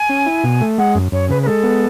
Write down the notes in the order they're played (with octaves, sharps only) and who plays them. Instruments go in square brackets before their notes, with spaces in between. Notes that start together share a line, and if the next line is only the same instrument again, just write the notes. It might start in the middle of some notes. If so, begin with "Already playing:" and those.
Already playing: [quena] G#5
[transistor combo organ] C#4
E4
B2
A3
[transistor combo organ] G#3 [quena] F#5
[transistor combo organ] F#2
[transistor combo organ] F#2 [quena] C#5
[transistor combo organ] C#3 [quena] B4
[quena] B4
[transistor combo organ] G#3 [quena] A4
[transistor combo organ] B3